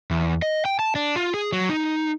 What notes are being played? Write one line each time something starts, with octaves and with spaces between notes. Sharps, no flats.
E2
D#5
G5
A5
D4
F4
G#4
F#3
D#4